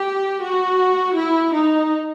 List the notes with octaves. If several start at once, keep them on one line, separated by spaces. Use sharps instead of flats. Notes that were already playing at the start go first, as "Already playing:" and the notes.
Already playing: G4
F#4
E4
D#4